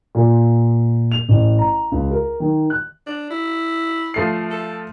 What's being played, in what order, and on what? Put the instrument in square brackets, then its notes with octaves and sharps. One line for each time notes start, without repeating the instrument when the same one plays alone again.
[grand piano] A#2
F7
A1
A#5
C#2
A#4
D#3
F#6
[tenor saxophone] D4
E4
[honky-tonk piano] F3 A3 C7
[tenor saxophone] A4